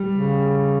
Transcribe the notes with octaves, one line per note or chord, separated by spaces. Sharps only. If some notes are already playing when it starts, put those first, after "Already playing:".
Already playing: G3
C#3